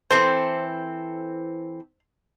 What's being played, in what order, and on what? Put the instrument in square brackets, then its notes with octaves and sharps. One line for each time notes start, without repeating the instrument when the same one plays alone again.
[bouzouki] E3 C4 A4 [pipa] C5